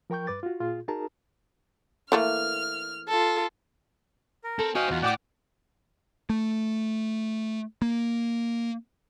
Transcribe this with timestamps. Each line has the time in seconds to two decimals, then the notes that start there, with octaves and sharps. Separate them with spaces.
0.10 F3 A#4 G5 C#6 G6
0.27 G2 B4 D6 A6
0.43 F4 F#4
0.60 A#2 F4 G#4
0.88 D#4 F#4 G#4 A#4 A5 A#5
2.12 E3 A3 A#3 F6
3.09 F4 A4
4.44 A#4
4.59 C4 A4
4.75 F#4 C5 D#5 F5 G5 G#5 D#6
4.91 E2 F4 F#5
5.02 A2 D5 F#5 G5 D6
6.30 A3
7.82 A#3